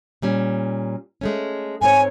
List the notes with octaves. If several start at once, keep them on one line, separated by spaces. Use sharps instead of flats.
A#2 G3 C#4
G#3 A3 C#4
G#2 C4 C#5 G#5